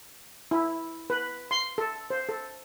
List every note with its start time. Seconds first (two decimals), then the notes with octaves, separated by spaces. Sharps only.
0.51 E4
1.10 B4
1.51 C6
1.78 A4
2.10 C5
2.29 A4